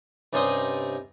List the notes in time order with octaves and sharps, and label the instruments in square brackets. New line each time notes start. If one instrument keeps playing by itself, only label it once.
[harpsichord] G2 C3 C#4 D#4 C6 D#6